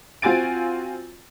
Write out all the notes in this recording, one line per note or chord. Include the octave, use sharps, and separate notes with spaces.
C4 F4 F#4 G#5 A6 D7